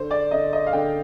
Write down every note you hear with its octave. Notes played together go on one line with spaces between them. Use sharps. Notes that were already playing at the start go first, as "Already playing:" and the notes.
Already playing: D3 C5
D5
D3 D#5
D#5
F5
D3 G5